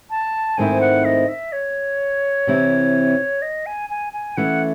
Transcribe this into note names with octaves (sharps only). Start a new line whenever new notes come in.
A5
G#2 D#3 A3 C4 E4 G#5
F#5
D#5
E5
C#5
C3 E3 C4 E4
D#5
G#5
G#5
G#5
E3 A3 C#4 F#5